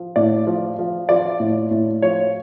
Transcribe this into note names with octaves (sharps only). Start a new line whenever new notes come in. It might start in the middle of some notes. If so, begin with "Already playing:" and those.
Already playing: F3
A2 D5
F3
F3
F3 D5
A2
A2
F3 C#5